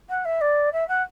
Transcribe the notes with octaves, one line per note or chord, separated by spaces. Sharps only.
F#5
E5
D5
E5
F#5